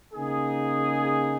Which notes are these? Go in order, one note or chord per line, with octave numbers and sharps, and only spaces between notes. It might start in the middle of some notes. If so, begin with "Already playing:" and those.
C#3 A#3 D#4 G#4